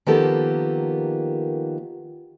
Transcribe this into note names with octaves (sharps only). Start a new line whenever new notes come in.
D#3 F3 A#3 B3 G4 A4